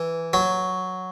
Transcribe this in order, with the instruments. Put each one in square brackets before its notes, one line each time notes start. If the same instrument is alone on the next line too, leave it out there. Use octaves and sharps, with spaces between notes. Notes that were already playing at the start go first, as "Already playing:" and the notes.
Already playing: [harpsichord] E3
F#3